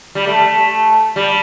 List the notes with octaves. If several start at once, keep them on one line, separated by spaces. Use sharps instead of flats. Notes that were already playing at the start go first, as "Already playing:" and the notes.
G3
A3
G3